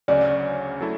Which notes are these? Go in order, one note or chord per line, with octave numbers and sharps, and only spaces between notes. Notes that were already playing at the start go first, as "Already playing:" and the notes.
D2 C#3 F#3 C#4 D5
F#3 A3 E4 A4